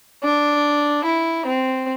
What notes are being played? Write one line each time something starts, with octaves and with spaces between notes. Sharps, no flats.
D4
E4
C4